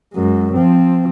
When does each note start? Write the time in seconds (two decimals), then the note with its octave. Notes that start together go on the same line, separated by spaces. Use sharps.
0.13 F#2 G#3
0.55 F3 C4